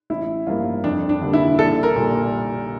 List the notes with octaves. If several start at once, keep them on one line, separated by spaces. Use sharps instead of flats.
A1 E4
G2 F3 A#3 F4
F2 D4
D4
D3 G3 A#3
E4
A#1 A4
A#4
A#2 G3